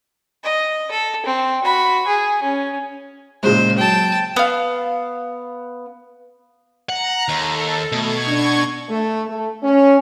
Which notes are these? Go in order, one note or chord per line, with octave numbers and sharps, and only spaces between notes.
D#5
A4
C4
F#4 B5
G#4
C#4
A#2 C#3 G#3 C5
F#3 G5 A5
B3 F5
F#5 A#5
D#2 A4
B2 A3 C#6 G#6
D4
A3
A3
C#4